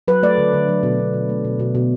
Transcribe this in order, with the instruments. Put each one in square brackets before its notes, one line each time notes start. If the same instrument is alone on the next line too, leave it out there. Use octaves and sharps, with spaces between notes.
[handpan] F#3 B4
A3 D5
D3
D3
F#3
B2
B2
B2
A3
B2
B2
B2